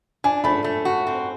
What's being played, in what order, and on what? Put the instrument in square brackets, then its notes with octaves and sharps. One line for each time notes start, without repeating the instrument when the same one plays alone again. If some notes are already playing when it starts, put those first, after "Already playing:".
[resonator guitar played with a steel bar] D4 [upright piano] G#5
[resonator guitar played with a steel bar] A3 [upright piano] B5
[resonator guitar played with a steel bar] A3
F#4
C4